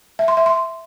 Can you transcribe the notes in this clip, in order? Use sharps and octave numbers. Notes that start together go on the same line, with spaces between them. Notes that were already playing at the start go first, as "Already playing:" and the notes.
E5
C6
E5
C6